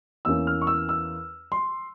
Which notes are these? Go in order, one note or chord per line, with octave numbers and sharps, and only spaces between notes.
E2 E3 A#3 C#4 E6
F6
C#6
E6
E6
C6